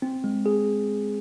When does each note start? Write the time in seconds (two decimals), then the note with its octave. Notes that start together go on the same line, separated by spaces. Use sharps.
0.02 C4
0.24 G#3
0.46 G#4